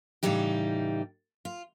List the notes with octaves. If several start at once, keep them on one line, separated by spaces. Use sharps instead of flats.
A2 C#3 E3 G3 D#4 G4
F4